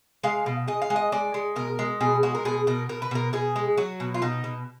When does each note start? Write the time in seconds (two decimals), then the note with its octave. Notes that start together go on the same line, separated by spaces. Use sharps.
0.24 G#3 F5
0.46 B2
0.68 G#3 D#5
0.82 F5
0.90 G#3
0.96 D#5
1.12 G#3 D5
1.34 G#3
1.56 B2 A#4
1.79 G#3
2.01 B2 G#4
2.23 G#3 F#4
2.35 A#4
2.45 B2 G#4
2.67 B2 A#4
2.89 B2 A#4
3.02 B4
3.11 B2 A#4
3.33 B2 G#4
3.56 G#3
3.77 F#3 F#4
4.00 B2
4.14 F4
4.22 B2 D#4
4.44 B2